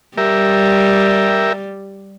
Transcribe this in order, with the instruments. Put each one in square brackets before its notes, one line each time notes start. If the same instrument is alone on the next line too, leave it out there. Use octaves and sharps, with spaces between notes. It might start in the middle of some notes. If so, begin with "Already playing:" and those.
[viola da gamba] G3 [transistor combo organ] G4 A#4 E5